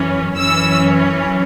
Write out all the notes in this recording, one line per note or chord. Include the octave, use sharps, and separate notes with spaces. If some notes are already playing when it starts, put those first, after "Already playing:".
Already playing: F#2 E3 C#4
F#2 E3 C#4 E6